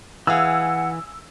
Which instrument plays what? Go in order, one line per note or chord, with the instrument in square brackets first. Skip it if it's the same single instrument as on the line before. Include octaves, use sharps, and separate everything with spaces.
[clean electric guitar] E3 [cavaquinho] G#4 F5 G#5 [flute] F#5 [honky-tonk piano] E6